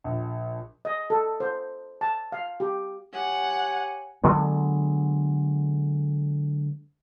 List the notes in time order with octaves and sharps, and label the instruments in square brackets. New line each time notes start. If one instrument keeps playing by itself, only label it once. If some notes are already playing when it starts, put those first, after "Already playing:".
[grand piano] A#1
[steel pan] D#5
A4
C5
A5
F5
G4
[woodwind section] G4 C#5 G#5 [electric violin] F#5
[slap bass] D3 F#3 G#3 B3